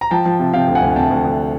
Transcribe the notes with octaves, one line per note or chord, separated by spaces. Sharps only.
A#5
F3 G5 A5
F3
C3
C3 F5 G5
D2
F#5 G#5
D2
C3 G5 A5
D2
D2